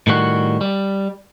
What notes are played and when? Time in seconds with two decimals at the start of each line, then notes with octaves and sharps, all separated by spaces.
0.07 A2 D#3 G3 F#4
0.61 G3